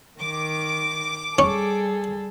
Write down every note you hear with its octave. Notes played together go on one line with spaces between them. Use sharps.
D#3 D6
G3 C#4 G#4 A4